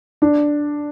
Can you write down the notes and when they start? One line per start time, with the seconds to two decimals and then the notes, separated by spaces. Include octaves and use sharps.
0.22 D4